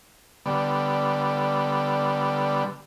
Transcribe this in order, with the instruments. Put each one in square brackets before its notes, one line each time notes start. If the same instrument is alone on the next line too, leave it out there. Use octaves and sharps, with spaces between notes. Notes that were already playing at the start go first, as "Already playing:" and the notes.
[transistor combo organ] D3 G3 B3